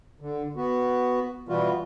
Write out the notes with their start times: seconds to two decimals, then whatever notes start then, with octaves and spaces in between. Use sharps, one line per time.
0.21 D3
0.56 B3 F#4
1.49 B2 E3 G3 F4 F#4